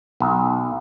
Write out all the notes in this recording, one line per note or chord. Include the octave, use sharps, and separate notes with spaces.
B1